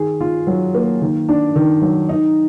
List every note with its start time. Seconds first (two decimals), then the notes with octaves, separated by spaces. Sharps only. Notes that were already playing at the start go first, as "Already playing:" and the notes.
Already playing: D#3 G#4
0.21 F4
0.47 F#3
0.74 A#3
1.01 D#3
1.29 D4
1.56 D#3
1.82 F#3
2.09 D#4